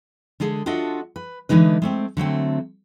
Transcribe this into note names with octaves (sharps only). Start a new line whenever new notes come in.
D3 G#3 G#4 A4
D4 F4 F#4 A4 D#5 E5
B4
D3 E3 G#3 D#4 B4
G#3 A3 C4
D3 F#3 A3 C4